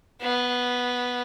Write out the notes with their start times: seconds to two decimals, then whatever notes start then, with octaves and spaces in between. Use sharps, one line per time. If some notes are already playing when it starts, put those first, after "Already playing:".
0.21 B3